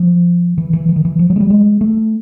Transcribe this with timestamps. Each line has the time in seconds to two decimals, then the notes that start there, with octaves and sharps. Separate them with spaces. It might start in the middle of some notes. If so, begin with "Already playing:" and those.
Already playing: F3
0.58 E3
0.73 E3
0.89 E3
0.96 D#3
1.05 E3
1.19 F3
1.30 F#3
1.36 G#3
1.40 G3
1.50 G#3
1.81 A3